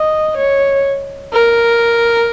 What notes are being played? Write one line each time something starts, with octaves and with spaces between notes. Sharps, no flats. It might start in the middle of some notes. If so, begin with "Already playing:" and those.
Already playing: D#5
C#5
A#4